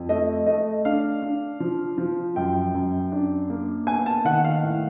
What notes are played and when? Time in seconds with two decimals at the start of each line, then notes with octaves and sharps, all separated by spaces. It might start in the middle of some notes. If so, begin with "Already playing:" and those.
Already playing: F2
0.09 A3 D#5
0.47 A3 D#5
0.85 D4 F5
1.22 D4
1.60 F3
1.98 F3
2.36 F#2 G5
2.74 F#2
3.12 D4
3.50 A#3
3.87 B3 G#5
4.06 A5
4.25 D#3 F#5
4.44 F5
4.63 A2